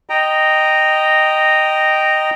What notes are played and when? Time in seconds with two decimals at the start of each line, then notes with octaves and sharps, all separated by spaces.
0.09 D#5 G5 A#5